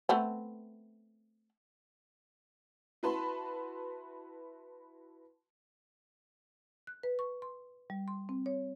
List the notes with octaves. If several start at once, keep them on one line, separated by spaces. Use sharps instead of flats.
A3 B3 C4
E4 F#4 B4 A5 B5 C6
F#6
B4
C#6
C6
G3
C6
C4
C#5